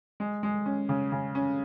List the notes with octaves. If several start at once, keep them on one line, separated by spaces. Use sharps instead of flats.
G#3
G#3
C#4
C#3
C#3
C#4